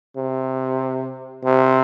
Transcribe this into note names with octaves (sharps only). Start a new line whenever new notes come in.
C3
C3